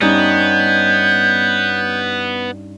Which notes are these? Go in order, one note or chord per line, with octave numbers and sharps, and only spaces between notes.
G2 B3 C#4 D#4 G6